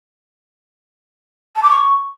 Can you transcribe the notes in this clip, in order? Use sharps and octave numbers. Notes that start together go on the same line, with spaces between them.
A5
D6
C#6